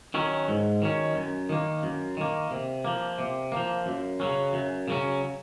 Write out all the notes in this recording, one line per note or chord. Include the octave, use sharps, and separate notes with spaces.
D#3 F#3 C#4
G#2
D#3 F#3 C#4
F#2
D#3 A#3
F#2
D#3 A#3
C3
F3 A#3
C3
F3 A#3
F#2
C#3 F#3 C#4
F#2
C#3 F#3 C#4